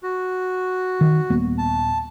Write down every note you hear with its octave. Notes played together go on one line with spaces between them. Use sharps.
F#4
D#3
D#1 A#3 B3
A5